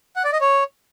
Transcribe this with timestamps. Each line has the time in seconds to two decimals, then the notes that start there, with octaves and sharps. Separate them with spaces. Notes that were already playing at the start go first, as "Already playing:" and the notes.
0.16 F#5
0.24 D5
0.32 D#5
0.41 C#5